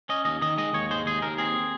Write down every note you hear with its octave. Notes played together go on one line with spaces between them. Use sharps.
C#4 D#5
D#2 D#5
D#3 D#5
G#3 D#5
D#2 C#5
G#3 C5
D#2 G#4
D#2 A#4
C4 G#4